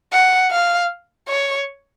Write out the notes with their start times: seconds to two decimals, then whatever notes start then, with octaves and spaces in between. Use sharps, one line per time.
0.12 F#5
0.51 F5
1.28 C#5